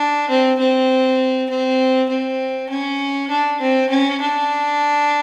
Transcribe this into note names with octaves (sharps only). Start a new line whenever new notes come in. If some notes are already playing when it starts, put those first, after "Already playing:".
Already playing: D4
C4
C4
C4
C4
C#4
D4
C4
C#4
D4